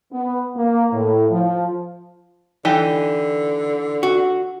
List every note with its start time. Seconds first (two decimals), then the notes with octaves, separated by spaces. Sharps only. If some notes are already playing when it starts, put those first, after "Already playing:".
0.12 B3
0.56 A#3
0.93 A2
1.31 F3
2.65 D3 E3 D#4 G4
4.03 F#4